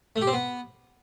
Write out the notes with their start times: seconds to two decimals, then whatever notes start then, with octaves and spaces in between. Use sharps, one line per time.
0.16 A3
0.21 G4
0.27 C4
0.33 B3